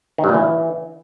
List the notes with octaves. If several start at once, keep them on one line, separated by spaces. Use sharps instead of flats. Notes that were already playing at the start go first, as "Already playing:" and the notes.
D#3
G2
A#2
E3